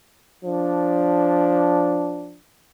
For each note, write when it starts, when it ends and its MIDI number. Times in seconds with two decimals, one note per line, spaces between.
0.45 2.38 53
0.45 2.38 62